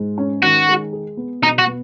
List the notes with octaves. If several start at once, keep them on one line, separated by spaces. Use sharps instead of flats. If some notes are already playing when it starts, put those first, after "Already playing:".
Already playing: G#2 G#3
C#4
D#3 F#4
G#3
G#4
B3
B2 D#4
F#4
B3